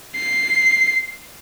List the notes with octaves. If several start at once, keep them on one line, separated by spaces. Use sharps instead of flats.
C7